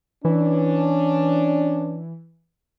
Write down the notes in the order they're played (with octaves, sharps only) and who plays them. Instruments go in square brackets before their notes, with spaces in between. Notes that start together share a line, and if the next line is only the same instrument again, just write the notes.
[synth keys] E3 [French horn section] C#4 D4